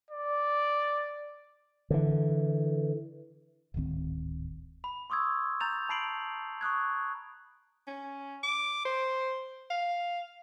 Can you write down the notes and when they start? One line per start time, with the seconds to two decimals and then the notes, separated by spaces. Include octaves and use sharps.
0.11 D5
1.90 D3 E3
3.74 D1 G#1 D#3 C4
4.84 B5
5.10 C6 C#6 D#6 E6 G#6
5.61 A#5 G6 A6 F7
5.89 A5 B5 C7 D7 F#7
6.61 C#6 D#6 F#6 G#6
7.87 C#4
8.43 D6
8.85 C5
9.70 F5